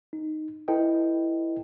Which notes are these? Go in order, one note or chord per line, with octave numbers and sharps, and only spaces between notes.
D#4
E4 A4 B4 D#5 G5 A5